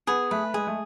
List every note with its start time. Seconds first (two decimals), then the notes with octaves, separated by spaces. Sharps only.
0.07 B3 G#4
0.31 A3 B4
0.54 G#3 G#4
0.67 A3